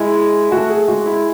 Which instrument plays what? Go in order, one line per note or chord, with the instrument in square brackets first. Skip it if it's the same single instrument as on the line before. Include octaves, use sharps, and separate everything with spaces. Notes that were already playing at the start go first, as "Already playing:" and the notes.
Already playing: [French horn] G#3 [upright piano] E4
[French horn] A3 [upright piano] F#4
[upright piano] G#4
[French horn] G#3 [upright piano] F#4
[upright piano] E4